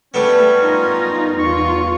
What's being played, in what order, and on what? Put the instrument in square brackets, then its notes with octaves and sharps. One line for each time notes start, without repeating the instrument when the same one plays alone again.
[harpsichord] G3 B3 [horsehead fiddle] A3 [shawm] C#4
[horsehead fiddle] D#4 [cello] F4 A#4
[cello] E2 F4 [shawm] C#6